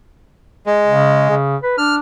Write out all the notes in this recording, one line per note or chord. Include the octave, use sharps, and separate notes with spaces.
G#3
C#3
C#3
B4
D4 F6